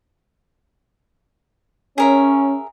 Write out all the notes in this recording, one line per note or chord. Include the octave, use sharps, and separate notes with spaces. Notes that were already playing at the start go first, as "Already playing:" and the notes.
C#4 G#4 A#4 E5